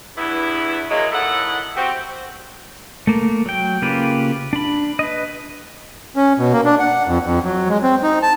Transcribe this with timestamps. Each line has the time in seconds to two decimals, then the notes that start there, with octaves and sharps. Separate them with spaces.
0.17 E2 G2 B3 E4
0.91 F#3 G#3 A#3
1.12 A2 D#3 A3 E4 A4 F#5
1.77 C4 F#4 G4
3.07 A3 A#3
3.46 F#3 G5
3.82 C#3 A#3 F4 G4 B4
4.53 D4 B5
4.99 B4 D#5
6.16 C#4
6.39 B2
6.53 A#3
6.65 D4
6.80 F#5
7.07 F2
7.25 F2
7.45 F#3
7.69 G#3
7.83 C4
8.03 D#4
8.23 A5